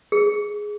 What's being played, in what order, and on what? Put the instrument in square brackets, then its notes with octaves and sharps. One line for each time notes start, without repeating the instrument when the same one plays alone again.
[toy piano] G#4